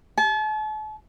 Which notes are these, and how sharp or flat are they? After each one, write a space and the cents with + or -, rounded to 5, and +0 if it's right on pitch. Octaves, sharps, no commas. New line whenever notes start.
A5 -40